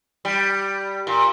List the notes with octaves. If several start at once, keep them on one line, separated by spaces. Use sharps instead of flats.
G3
A#2